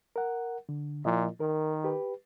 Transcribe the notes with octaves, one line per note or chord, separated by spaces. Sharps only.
A#4 F#5
D3
A#2 F3 E4 D#5
D#3 A#4
G4 B4